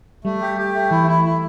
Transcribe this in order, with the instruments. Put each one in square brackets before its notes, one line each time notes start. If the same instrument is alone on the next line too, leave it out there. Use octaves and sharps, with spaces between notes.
[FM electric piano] G3 [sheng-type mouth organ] A3
[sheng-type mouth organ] G4
G4
A3
[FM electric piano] E3 [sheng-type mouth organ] E4
[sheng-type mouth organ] E4
E4